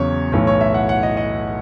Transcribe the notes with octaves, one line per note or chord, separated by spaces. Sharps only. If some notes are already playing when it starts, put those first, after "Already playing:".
Already playing: E2 C#3 F#3 C#5
B1 A2 E3 C#5
C#5
E5
F#5
F#5
D#5
D#5